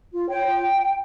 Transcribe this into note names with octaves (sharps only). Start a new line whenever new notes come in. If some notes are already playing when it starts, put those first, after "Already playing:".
F4
C#5 G5
F4